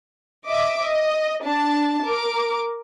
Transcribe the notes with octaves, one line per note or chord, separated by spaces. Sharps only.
D#5 E5 D6
D#5
D4 A5
A#4 D6